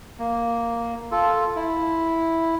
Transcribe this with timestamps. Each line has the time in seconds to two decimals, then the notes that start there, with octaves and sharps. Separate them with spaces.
0.19 A#3
1.11 F4 A4
1.56 E4